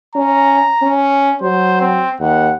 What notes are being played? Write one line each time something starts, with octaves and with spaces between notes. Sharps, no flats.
C#4 A#5
C#4
F#3 C5
C4
D#2 F#5